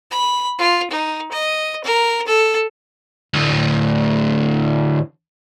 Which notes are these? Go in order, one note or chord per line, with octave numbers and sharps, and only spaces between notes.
B5
F4
D#4
D#5
A#4
A4
D2 A2